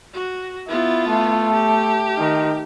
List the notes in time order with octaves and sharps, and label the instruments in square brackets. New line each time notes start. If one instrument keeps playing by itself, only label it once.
[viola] F#4
[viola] B3 F4 [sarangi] E4
[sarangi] A3
[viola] G4
[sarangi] D#3